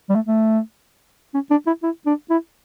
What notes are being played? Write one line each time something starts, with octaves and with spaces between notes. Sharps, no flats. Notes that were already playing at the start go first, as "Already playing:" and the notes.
G3
A3
A3
C#4
D4
E4
E4
D4
E4